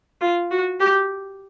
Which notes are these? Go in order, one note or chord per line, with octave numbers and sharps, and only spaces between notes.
F4
F#4
G4